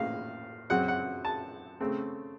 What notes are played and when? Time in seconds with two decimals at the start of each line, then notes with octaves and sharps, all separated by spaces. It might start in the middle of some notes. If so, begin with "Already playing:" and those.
Already playing: A2 A#3 F5
0.70 F#2 C#3 F#3 C4 F#5
0.88 F#5
1.25 A5
1.80 C#3 A3 C4